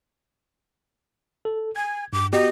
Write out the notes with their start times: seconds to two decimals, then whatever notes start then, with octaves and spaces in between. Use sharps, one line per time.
1.45 A4
1.76 G#5 G#6
2.13 G2 D6
2.33 B3 F#4 G4 D#5